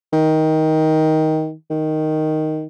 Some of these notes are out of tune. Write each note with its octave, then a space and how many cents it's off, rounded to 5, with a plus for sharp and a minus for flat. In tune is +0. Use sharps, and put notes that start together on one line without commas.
D#3 +15
D#3 +0